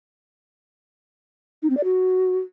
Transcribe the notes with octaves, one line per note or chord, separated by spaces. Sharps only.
D#4
C4
D5
F#4